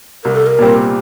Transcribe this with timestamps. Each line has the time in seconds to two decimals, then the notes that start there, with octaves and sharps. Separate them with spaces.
0.24 C2 A#4
0.35 A4
0.46 A#4
0.59 A#2 G3 C4